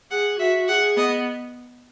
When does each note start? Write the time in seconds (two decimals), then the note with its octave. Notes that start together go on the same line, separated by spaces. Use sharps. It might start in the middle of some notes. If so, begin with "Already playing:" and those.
0.11 G#4 F#5
0.39 F#4 E5
0.68 G#4 F#5
0.96 B3 D#5